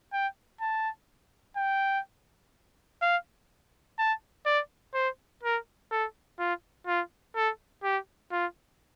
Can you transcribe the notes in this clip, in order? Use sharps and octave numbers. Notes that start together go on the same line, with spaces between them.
G5
A5
G5
F5
A5
D5
C5
A#4
A4
F4
F4
A4
G4
F4